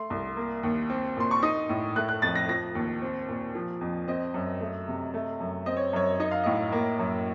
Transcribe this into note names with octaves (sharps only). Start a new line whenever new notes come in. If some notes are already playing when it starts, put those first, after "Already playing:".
Already playing: A3 C6
C2
A#3
D#2
C4
A#2 C6
C#6
D#4 D#6
A2
A3 F#6
F#6
F2 A6
A#6
F3 A#6
D#2
C4
A#2
F3
F2
C4 D#5
F#2
A3
C3
A3
F#2
C4 D#5
C#5
F#2 C#5
D#4 D#5
F5
A2 D#5
A#3
F#2